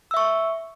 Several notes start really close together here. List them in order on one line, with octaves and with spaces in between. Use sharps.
E6 E5 C#6